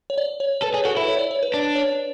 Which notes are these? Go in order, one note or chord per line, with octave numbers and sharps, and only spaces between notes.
C#5
D5
C#5
A4 B4
G#4 C#5
F#4 A4
E4 B4
C#5
D5
C#5
B4
D4
C#5